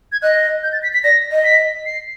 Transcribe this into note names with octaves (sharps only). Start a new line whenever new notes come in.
G#6
D#5 F#6
G6
A6
B6
B6
D5 A#6
D#5
B6
C7